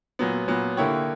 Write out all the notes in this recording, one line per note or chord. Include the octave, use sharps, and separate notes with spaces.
A#2 F#3 B3
A#2 F#3 B3
D3 A#3 E4 G4 C#5